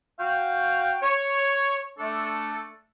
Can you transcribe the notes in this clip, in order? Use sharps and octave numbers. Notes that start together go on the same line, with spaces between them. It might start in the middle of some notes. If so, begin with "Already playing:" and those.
F#4 F5 G5
C#5
A3 D4 A4